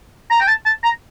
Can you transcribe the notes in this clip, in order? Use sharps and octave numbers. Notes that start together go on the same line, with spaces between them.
A#5
G5
A5
A5
A#5